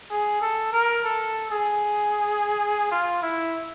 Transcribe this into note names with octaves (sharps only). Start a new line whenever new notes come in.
G#4
A4
A#4
A4
G#4
F4
E4